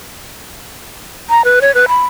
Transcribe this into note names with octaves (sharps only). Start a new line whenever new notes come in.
A#5
B4
C#5
B4
B5